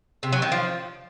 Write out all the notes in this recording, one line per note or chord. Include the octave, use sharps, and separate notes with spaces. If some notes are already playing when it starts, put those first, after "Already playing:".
C3
F#3
D#3
F3